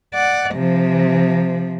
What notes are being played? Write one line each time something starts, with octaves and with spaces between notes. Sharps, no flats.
D5 F#5
C3 F3